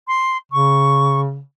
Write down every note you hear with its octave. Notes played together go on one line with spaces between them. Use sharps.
C6
C#3 C#6